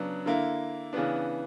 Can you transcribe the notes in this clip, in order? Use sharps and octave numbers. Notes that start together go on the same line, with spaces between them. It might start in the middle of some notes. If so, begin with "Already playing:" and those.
Already playing: C#3 F#3 B3 D4
D3 A#3 E4
C#3 E3 B3 D4